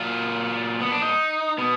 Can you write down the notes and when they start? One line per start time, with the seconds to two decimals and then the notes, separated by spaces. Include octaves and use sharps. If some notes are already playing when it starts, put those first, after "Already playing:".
Already playing: A#2 F#3 F4
0.81 B3
0.91 D4
1.02 D#4
1.58 B2 B3